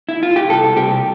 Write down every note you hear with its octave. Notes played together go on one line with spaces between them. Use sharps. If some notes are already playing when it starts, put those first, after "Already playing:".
E4
F4
G4
C2 A4
C2 G4